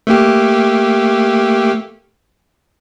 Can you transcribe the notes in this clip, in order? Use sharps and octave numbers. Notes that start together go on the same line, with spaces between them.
A3 A#3 G4